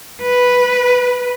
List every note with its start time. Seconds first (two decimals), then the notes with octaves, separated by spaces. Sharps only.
0.22 B4